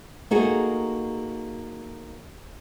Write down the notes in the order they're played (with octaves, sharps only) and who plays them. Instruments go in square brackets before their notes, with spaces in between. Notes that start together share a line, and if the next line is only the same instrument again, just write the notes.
[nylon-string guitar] A#3 D#4 F#4 G#4 A4